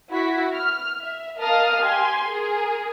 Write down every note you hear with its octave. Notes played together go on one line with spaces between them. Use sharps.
E4 F#4 B6
F6
E5
A#4 D#5 F5 A5 D#6 F6
G4 G#5 C6
G#4 A#4